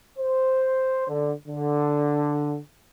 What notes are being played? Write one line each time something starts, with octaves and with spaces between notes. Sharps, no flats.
C5
D3
D3